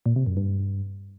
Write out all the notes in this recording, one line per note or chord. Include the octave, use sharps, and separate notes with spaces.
A#2
C3
F#2
G2